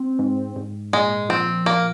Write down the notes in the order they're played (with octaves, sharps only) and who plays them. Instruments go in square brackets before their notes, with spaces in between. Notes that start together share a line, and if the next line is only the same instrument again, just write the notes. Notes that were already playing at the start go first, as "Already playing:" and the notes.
Already playing: [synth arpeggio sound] C4
G#2
G#2
[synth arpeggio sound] A#2 [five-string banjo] G#3
[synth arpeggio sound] F3 [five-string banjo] C4
[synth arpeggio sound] A#2 [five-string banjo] A#3